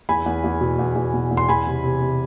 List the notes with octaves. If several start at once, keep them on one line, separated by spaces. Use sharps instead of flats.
E2 G#5 B5
E2
E2
B2
E2
E2
B2
E2
C6
E2 G#5 B5
C3
C3
C3